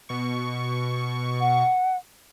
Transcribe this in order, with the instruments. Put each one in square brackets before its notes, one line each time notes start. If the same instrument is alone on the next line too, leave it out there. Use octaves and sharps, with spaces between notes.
[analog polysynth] B2 C#6
[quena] F#5